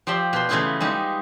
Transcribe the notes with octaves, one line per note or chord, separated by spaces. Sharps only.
F3 G4 D5 E5 C6
B2 C5 C6
C#3 E3 A3 B3 E4 F4
G3 G#3 D#4